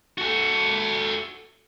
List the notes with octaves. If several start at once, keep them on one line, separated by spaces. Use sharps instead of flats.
F#4 A4